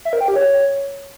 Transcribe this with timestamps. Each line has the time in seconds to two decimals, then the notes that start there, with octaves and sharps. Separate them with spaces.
0.05 E5
0.13 A#4
0.21 G5
0.28 G4
0.36 C#5